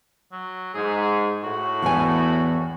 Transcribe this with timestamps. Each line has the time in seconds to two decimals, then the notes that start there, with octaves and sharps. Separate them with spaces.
0.32 F#3
0.74 G#2 G#4
1.43 A2 F#4
1.82 E2 G#5